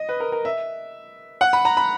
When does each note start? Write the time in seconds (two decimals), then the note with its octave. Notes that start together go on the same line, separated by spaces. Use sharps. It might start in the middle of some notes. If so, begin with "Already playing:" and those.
Already playing: D#5
0.09 B4
0.20 A#4
0.32 A#4
0.45 E5
1.41 F#5
1.53 B5
1.65 A#5
1.77 B5